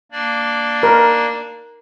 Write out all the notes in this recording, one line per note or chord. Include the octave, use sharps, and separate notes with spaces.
A#3 D4 D5
A#4